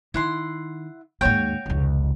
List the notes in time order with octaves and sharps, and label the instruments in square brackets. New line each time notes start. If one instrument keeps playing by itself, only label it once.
[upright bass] D#3 [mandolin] E4 F#5 C6
[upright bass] D#2 G#2 [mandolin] F#4 C#5 G5
[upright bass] F1 C#2